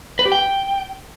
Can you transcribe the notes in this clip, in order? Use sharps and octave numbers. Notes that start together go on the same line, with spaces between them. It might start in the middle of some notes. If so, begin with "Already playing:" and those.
B4
G4
G5